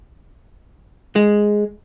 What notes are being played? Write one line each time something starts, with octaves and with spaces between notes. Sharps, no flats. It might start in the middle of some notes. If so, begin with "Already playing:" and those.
G#3